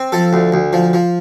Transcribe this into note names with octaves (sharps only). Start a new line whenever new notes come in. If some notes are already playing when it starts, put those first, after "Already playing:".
Already playing: C4
F3 A4
D2
D2
F3
F3